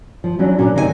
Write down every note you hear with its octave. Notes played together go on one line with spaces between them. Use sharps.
F3
E3 F#3 C#4 D4
A#2 C#4 D4 F#4
D2 C3 D#3 D#4 G4 G#5